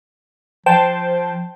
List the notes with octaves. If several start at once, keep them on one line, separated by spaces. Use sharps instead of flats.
F3 C5 G5 A5